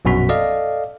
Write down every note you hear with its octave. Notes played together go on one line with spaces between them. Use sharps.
A#1 F#2 B2 F#4 B6
A4 D5 D#5 F5